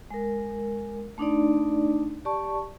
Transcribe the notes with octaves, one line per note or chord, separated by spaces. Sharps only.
G#3 A#4
A3 D4 D#4 D5
G4 D5 A5 C#6